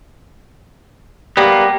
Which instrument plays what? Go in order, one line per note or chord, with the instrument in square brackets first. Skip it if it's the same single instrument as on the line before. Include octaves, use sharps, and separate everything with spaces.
[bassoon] G3 [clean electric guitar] A#3 B3